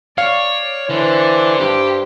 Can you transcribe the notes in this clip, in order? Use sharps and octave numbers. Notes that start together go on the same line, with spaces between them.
C#5 D5 F5
D3 E3 C5
G2 G4